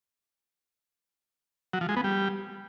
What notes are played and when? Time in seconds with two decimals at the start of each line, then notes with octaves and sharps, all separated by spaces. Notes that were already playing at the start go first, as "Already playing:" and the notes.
1.73 F#3
1.81 F3
1.89 G#3
1.96 B3
2.04 G3